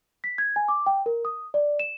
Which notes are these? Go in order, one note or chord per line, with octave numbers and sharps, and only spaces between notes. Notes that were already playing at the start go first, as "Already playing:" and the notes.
B6
G#6
G#5
D6
G5
A#4
D#6
D5
E7